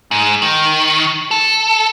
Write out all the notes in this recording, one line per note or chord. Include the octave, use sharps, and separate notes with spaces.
G#2
D#3
A4